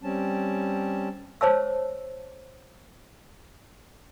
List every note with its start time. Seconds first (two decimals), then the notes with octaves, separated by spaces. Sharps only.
0.03 G3 C4 C#4 A5
1.41 C5 C#5 A5 E6